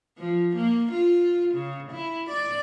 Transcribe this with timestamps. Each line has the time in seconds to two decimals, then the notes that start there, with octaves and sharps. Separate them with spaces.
0.18 F3
0.56 A#3
0.92 F4
1.55 C#3
1.92 E4
2.30 D5